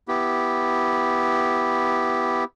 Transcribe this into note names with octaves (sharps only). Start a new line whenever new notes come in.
B3 E4 G4